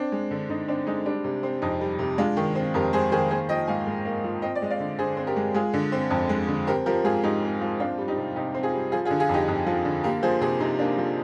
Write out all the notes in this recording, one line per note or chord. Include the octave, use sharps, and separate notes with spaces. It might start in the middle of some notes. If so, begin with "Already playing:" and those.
Already playing: C4 D4
G#3
D3
D3 D#4
C4 D4
G#3 D#4
G3 D4
C3
C4
F2 D#4
G3
C3
G#3 D4 F4
D#3
C4
F2 G4 A#4
G#3 G#4 C5
D#3 G#4 C5
A#3 G#4 C5
F3 D#5 G5
G#2 F5 G#5
G#2
A#3
F3
C4 D#5 G5
D5
G#3 D#5
D5 F5
D3
D3 G#4 C5
C4
G4 A#4
G#3
G#3 F4 G#4
D3
C4
F2
G#3
D3
C4 G4 A#4
F3 G4 A#4
G#2 F4 G#4
G#2 D#4 G4
C4
F3
C4 D4 F4
G3
D#4 G4
C3
C3 D#4 G4
C4
F4 G#4
G3
F3 F4 G#4
F4 G#4
D3
F4 G#4
F2 D#4 G4
F2
F3
D3
A#3 G4 A#4
F3 G#4 C5
C3 G#4 C5
C3 D#4
A#3 D4
F3